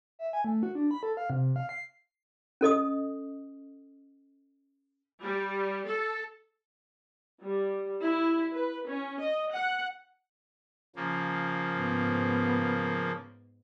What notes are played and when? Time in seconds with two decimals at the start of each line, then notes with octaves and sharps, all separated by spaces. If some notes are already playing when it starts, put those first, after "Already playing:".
0.19 E5
0.33 G#5
0.44 A3
0.63 F#4
0.75 D4
0.91 B5
1.03 A4
1.17 F5
1.30 C3
1.56 F5
1.69 C7
2.61 C#4 A4 D#5 D#6
5.22 G3
5.87 A4
7.41 G3
8.02 E4
8.54 B4
8.87 C#4
9.19 D#5
9.53 F#5
10.96 C#3 F3 A#3
11.75 G#2 B3